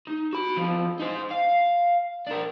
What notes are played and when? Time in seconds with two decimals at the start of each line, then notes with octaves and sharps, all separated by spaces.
0.07 D#4
0.33 F#4 B5
0.56 E2 F3
0.99 D#4 C5
1.31 F5
2.27 D4 A#4